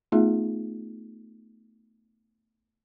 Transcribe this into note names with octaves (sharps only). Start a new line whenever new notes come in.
A3 B3 D#4 F4 G#4 E5